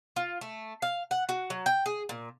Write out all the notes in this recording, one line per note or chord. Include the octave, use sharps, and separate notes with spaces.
F4
A3
F5
F#5
F#4
F#3
G5
G#4
A#2